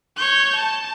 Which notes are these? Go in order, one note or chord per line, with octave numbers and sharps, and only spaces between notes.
C#5 G6
A5